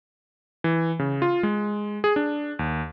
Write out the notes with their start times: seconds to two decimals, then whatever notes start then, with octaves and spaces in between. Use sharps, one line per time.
0.64 E3
0.99 C#3
1.22 F4
1.43 G#3
2.04 G#4
2.16 D4
2.59 D#2